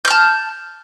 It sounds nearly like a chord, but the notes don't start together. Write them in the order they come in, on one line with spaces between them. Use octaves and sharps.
G6 F6 A5